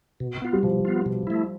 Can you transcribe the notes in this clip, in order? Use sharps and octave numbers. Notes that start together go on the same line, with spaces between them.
B2
B3 F4
G3
B2 F3
B3 F4
B2
A3 E4